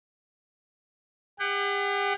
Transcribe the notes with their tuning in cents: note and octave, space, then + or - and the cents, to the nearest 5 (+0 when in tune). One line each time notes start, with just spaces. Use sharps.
G4 +45 F#5 +30